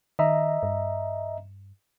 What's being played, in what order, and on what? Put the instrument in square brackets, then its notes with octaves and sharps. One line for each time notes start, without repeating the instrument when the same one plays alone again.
[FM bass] D#3 [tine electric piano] D#5 E5 A#5
[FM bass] G2